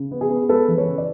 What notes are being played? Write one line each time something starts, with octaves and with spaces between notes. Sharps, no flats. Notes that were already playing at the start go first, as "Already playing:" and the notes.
Already playing: C#3
B3
G#4
B3
G#3 A4 B4
E3
B4 C#5
C#3
D5